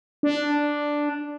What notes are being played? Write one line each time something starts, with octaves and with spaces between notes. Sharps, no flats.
D4